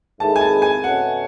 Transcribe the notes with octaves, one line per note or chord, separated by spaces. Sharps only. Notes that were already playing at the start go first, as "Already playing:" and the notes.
G#2 D#3 A3 E4 G#4 A5
G#5
A5
G#5
B2 A3 C#4 F#5